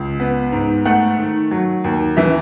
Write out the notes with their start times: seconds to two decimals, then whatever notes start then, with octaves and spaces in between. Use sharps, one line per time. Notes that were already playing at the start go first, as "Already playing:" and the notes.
Already playing: C#2
0.20 B3
0.52 G#2
0.85 A3 F#5
1.19 D#3
1.51 F#3
1.84 D#2
2.17 E3 E5